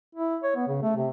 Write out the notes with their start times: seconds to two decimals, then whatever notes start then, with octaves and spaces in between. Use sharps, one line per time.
0.15 E4
0.43 C#5
0.55 B3
0.67 C#3
0.82 A3
0.96 C3